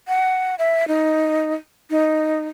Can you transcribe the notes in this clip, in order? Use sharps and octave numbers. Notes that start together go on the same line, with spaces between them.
F#5
E5
D#4
D#4